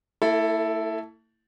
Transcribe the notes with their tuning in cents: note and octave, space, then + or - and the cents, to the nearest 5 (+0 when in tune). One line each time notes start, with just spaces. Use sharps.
A3 +45 E4 +0 A4 +0